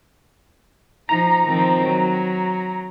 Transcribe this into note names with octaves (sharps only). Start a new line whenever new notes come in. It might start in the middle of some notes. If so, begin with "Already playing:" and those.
F3 D#4 A#5
D#3 F3 C4
F#3